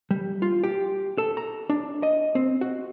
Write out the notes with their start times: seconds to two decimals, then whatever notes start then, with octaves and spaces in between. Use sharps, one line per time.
0.11 G3
0.42 F4
0.63 G4
1.18 A4
1.37 A#5
1.70 D4
2.03 D#5
2.35 C4
2.61 F#4